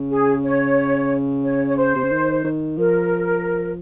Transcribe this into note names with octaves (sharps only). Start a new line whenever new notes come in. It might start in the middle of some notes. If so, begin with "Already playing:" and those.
Already playing: C#3
G#4
C#5
C#5
C#5
C5
C3
C#3
D#3
D#3
F3 A#4